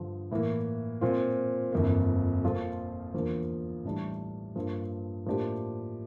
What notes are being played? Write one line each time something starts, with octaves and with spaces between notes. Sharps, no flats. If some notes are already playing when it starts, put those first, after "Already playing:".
Already playing: G2 D3 F3
A2 E3 A#3
A#2 F3 C4 F4
G1 F2 E3 A#3
A#2 F3 A#3 F4 A4
E2 D3 F3 A#3
A1 A2 G3 D4
G2 F3 A#3 D4
A2 F3 A#3 D4 G4